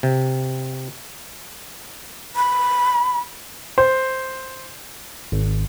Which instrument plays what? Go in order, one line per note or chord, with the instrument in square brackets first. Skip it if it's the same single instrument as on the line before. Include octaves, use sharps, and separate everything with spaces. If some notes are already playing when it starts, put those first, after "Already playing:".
[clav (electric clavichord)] C3
[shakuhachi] B5
[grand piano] C5
[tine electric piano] G#1